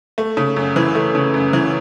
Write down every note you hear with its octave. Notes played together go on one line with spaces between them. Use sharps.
A3
C#3
F#2
E3
A3
C#3
F#2
E3